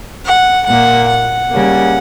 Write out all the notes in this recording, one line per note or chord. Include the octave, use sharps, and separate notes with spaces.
F#5
A#2 A#3 F#5
F#5
C#3 G3 A#3